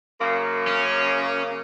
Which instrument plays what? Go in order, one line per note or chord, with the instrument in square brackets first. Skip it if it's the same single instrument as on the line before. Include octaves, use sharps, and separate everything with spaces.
[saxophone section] F#2 C#3 A#3
[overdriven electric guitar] C#4